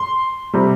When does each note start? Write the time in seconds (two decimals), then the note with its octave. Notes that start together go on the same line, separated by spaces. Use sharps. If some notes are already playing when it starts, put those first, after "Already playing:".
Already playing: C6
0.53 C3 G3